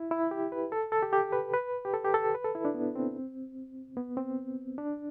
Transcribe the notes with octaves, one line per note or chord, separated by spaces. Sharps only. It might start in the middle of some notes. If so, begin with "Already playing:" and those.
Already playing: E4
E4
G4
B4
A4
A4
G4
G4
B4
B4
G4
A4
G4
A4
B4
A4
E4
D4
B3
C4
B3
C4
D4